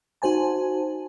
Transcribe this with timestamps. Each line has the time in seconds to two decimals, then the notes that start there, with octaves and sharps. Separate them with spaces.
0.22 D#4 F#4 C5 G#5 A5